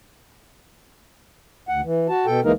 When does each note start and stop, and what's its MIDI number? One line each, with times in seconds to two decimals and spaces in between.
1.69 1.81 38
1.69 1.81 78
1.84 2.07 52
2.09 2.26 66
2.09 2.26 81
2.26 2.40 47
2.26 2.40 69
2.26 2.40 79
2.44 2.52 38
2.44 2.52 52
2.44 2.52 56
2.44 2.52 58
2.44 2.52 63
2.44 2.52 70